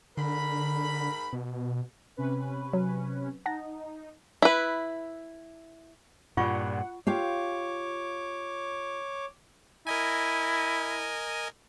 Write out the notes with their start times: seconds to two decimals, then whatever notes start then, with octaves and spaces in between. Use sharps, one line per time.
0.17 G#2 D3 A#4 B5
1.33 B2
2.17 C3 C#4 B4
2.73 F#3
3.46 D#4 F#5 A5 A#6
4.42 E4 B4
6.37 G2 A#2 F4 F#5 C#6
7.07 F4 G4 C#5 F5 D6
9.87 E4 A#4 D#5 G#5